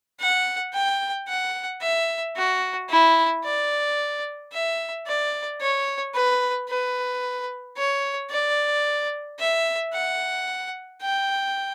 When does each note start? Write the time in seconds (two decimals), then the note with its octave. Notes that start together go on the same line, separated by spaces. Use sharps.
0.20 F#5
0.74 G5
1.28 F#5
1.81 E5
2.37 F#4
2.90 E4
3.45 D5
4.52 E5
5.07 D5
5.61 C#5
6.14 B4
6.69 B4
7.77 C#5
8.31 D5
9.39 E5
9.93 F#5
11.02 G5